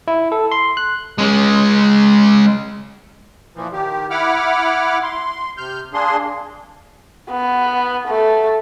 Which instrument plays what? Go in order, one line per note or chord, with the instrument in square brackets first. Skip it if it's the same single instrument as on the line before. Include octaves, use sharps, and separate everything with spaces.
[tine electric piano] E4
A4
C6
F#6
[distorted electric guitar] G#3 C#4
[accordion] A#2 E3 F3
D#3 G4
E4 F#5 B5 D6 F6
C6
C3 F6 G6
A#3 D4 G#4 C6
[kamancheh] B3
A3